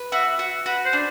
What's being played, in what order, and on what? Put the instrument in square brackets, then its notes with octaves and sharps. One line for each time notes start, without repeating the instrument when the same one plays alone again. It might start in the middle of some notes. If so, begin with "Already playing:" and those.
Already playing: [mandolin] B4
[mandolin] F#4 [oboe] E5
[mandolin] F#4
[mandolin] F#4 [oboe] B4
[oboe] C5
[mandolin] D4